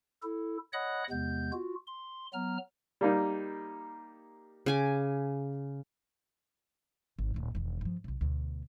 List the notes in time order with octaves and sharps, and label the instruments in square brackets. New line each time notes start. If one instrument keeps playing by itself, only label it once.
[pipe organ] E4 A4
C#5 D#5 F#5 B5 D#6 F#6
E2 C3 G#3 B3 G6
F4 F#4
C6
F#3 B3 A#5 F6
[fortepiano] G3 A#3 D#4
[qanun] C#3 G#5 D6
[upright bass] G#1
D1 A#2
E1 D#3
G2 F3
B1 C3
D2 B2